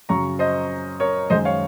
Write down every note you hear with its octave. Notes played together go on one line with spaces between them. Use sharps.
F#2 C#3 F#3 A#5 C#6
C5 D#5
A#4 C#5
F#2 D#3 G#3 C5 D#5
C#5 F5